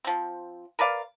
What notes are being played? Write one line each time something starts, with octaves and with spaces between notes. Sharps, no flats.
F3 C4
A#4 B4 D5 F5